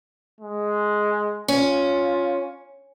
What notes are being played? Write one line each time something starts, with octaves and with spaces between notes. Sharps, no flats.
G#3
C#4 F4